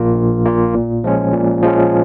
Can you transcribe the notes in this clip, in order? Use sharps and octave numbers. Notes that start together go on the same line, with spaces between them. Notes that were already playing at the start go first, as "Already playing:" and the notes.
Already playing: A#1 A#2 A#3 F4
A#1
A#2 A#3 F4
A#2
F3 G#3 C#4
A#2
F3 G#3 C#4